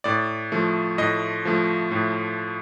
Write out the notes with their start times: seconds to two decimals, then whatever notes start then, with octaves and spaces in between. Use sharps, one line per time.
0.04 A2 D5
0.52 F3 A3
0.98 A2 D#5
1.45 F3 A3
1.91 A2